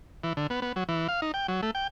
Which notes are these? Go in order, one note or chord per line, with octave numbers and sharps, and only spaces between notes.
E3
D3
B3
B3
F#3
E3
F5
D#4
G5
F#3
A3
G5